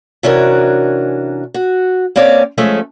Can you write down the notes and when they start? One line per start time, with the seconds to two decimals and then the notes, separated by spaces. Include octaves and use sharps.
0.23 C3 E3 C#4 D4 F#4 A#4
1.54 F#4
2.16 A#3 C4 C#4 C#5 D5
2.58 F3 G#3 A3 C#4 A4 E5